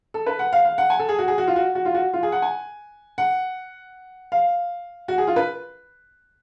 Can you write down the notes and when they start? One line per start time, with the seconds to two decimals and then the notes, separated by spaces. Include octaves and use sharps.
0.14 A4
0.26 B4
0.39 F#5
0.53 F5
0.65 F5
0.78 F#5
0.90 G#5
0.99 A4
1.09 G#4
1.19 F#4
1.28 G#4
1.38 F#4
1.47 F4
1.56 F#4
1.75 F#4
1.85 F4
1.95 F#4
2.13 F4
2.23 G#4
2.32 F#5
2.42 G#5
3.18 F#5
4.32 F5
5.08 F#4
5.18 G#4
5.27 F4
5.36 B4